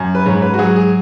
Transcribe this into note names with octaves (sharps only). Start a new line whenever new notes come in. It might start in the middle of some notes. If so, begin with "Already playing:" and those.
Already playing: F#2
B4
G#2 C#5
B4
F#4
F#3 G#4
G#4